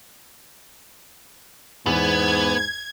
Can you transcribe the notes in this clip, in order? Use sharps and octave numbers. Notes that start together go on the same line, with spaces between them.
E2 G#2 B3 G#6